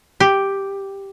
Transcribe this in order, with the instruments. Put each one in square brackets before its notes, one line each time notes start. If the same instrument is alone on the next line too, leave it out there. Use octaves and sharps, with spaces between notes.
[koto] G4